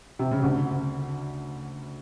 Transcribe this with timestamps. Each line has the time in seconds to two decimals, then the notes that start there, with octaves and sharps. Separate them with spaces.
0.19 C3
0.31 C#3
0.43 D2 D3